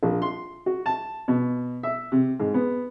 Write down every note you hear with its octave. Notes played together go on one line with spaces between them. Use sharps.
A#1
C6
F#4
A5
B2
E5
C3
G#2
B3